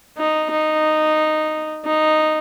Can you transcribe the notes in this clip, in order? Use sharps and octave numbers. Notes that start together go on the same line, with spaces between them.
D#4
D#4
D#4